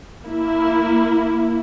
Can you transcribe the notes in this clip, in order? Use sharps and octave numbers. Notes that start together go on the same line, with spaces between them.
A#3 E4